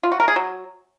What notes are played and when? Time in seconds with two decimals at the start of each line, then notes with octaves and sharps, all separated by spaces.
0.03 F4
0.12 F#4
0.20 A#4
0.28 G#4
0.36 F#3